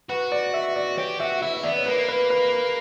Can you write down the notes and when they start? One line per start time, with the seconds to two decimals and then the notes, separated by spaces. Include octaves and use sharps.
0.09 F#4 B4
0.32 D5
0.54 E5
0.76 D5
0.98 G4 C#5
1.20 F#4 E5
1.42 E4 E5
1.54 E5
1.63 B3 D5
1.78 C#5
1.86 A#3 B4
2.08 B4
2.30 B4
2.52 A#4